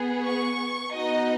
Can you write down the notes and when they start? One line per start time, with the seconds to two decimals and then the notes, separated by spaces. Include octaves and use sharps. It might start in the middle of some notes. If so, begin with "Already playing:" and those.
Already playing: B3 G#4
0.24 C#6
0.94 B3 D#4 F#4 D#5